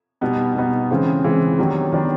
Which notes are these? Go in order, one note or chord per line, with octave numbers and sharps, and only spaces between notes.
B2 G3 B3 D#4
B2 G3 B3 D#4
C#3 E3 G#3 C4
C#3 E3 G#3 C4
D#3 F#3 B3 D4 G4
D#3 F#3 B3 D4 G4